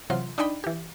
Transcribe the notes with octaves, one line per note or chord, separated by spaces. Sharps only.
C3 E3 F#3 F4 C6
D4 D#4 D5 D#5 G5 B5
E3 G4